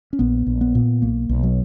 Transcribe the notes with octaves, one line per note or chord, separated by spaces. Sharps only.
C#4
A#1 B3
A#1
B3
A#2
B1 A#3
B1
F#3